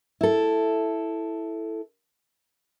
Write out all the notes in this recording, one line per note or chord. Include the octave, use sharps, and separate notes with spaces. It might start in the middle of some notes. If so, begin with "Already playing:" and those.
E4 A4